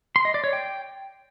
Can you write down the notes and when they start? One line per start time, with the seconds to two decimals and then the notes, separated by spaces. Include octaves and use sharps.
0.16 C6
0.25 D#5
0.34 D5
0.44 C#5
0.53 G5